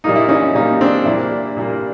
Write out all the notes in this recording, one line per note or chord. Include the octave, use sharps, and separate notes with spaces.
A#2 G3 A#3 D#4
E4
C#4 D#4
A#2 G3 A#3 C#4 D#4
C4 D4
A#2 G3 A#3 D4 E4
A#2 G3 A#3